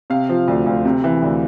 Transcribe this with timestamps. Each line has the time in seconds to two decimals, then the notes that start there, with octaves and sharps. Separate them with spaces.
0.10 C3 F5
0.29 F3
0.48 D2
0.66 D2
0.85 C3
1.04 E3
1.22 D2